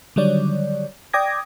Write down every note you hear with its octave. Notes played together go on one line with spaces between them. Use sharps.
D3 D#3 F#3 G3 C#5 D5
D5 G5 D6 D#6 G#6 A#6